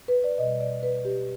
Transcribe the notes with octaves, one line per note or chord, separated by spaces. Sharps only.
B4
D5
B2 G3 D#5
D5
B4
G4